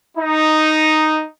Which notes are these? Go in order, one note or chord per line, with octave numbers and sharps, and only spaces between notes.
D#4